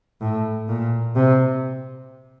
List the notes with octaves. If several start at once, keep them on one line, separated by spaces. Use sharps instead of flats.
A2
A#2
C3